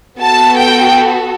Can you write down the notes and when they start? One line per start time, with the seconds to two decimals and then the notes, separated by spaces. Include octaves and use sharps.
0.20 B3 F#4 A4 A5
0.59 G5